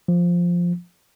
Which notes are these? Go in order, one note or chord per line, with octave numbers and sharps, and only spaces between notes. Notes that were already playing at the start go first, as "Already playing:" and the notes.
F3